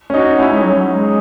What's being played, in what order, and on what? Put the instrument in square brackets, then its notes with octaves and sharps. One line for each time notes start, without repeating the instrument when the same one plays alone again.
[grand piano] C#4
[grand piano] D#4 [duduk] F#4
[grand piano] C#4 [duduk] E4
[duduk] G#3
F#3
G#3